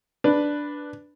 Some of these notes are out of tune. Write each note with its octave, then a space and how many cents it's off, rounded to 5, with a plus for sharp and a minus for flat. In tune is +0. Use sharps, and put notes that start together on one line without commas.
D4 +0 B4 +0